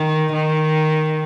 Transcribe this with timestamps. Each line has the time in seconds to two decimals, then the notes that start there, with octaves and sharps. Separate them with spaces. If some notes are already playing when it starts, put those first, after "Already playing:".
Already playing: D#3
0.33 D#3